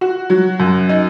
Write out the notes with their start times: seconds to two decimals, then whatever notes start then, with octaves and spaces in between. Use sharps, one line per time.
0.01 F#4
0.30 F#3
0.60 F#2
0.89 D#4